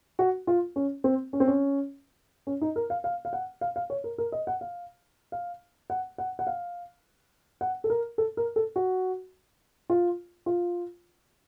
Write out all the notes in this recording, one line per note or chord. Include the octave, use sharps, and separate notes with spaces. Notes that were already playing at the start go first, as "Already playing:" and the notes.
F#4
F4
C#4
C4
C#4
C4
C#4
C#4
D#4
A#4
F5
F5
F5
F#5
F5
F5
C#5
A#4
A#4
D#5
F#5
F5
F5
F#5
F#5
F#5
F5
F#5
A4
A#4
A4
A#4
A4
F#4
F4
F4